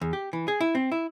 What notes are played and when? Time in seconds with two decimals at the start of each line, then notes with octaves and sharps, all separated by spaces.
0.01 E2
0.13 G4
0.33 E3
0.48 G#4
0.61 E4
0.75 C4
0.92 E4